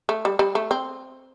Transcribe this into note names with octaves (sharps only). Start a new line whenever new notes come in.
A3
G3
G3
A3
C4